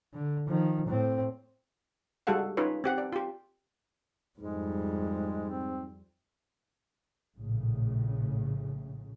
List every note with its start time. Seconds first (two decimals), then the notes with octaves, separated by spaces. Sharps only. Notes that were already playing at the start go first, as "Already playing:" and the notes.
0.14 D3
0.48 D#3 F3
0.87 A2 C4
2.27 G3 G#3 F#4 A4 F5 F#5
2.57 C#4 D#4 F4 B4 C#5
2.84 C4 G4 F#5
2.98 D5
3.13 F4 G4
4.40 F2 G#2 G3 G#3
5.49 C4
7.37 A#1 A2 C#3